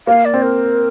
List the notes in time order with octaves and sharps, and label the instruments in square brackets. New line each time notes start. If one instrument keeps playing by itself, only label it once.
[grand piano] A#3 [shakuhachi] F5
[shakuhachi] D5
[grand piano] C4
[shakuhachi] A#4